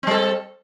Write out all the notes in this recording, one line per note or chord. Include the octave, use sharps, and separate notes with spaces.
G3 C4 A4